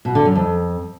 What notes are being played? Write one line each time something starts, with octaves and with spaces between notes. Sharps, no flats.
B2
D3
F#2
F2